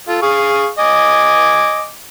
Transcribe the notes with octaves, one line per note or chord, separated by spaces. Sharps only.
F4 A4
G#4 F5 C#6
D#5 G#5 D6